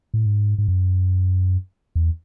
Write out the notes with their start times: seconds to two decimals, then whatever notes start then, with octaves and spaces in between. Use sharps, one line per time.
0.14 A2
0.26 G#2
0.58 G#2
0.68 F#2
1.95 E2